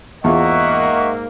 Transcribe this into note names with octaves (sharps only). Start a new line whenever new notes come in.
E2 G#2 A#3 F4 D#5 E5 F#5 C#6